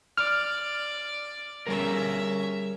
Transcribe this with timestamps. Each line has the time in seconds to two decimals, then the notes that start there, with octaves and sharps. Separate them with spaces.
0.17 D5 F6
1.67 G3 C#4 G#4 A#4 E5